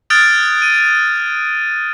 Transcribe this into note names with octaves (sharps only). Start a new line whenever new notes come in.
D#6 F6 F#6 G#6 A6 D7
D#7